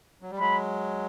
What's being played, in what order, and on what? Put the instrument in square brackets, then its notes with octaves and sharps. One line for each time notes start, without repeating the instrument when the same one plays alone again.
[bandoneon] F#3
G3
[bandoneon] F#3 G#3 [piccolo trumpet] B5